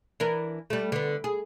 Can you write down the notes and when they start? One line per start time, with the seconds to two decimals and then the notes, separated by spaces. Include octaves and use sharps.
0.20 E3 D4 A#4
0.70 G3 A3
0.92 D3 B3
1.24 G#4